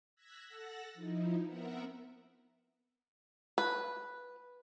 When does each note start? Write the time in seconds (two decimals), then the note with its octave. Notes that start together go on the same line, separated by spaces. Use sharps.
0.16 E6 F#6 G#6 A#6 B6
0.48 A4 F#5 E6 F#6 A6 A#6
0.94 F3 D#4 E4
1.44 B3 C4 A#4 E5 F#5 A#5
3.58 B4